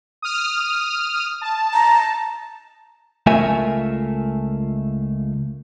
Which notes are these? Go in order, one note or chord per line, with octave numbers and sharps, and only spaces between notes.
D#6 F6
A5
A#5
C#2 A3 F4 A#4 E5 G#5